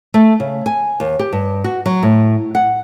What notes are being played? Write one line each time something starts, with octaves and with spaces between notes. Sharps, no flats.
A3
C#3
G#5
D#2
G4
G2
F#4
F#3
A2
F#5